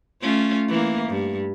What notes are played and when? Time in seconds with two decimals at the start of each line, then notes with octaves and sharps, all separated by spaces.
0.22 A3 C#4 F4
0.69 E3 A#3
1.09 G2